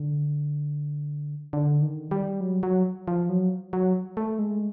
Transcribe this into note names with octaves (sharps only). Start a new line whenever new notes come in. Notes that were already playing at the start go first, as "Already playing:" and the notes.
Already playing: D3
D3
D#3
G3
F#3
F#3
F3
F#3
F#3
A3
G#3